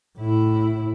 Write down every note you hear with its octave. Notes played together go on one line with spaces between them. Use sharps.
A2 E4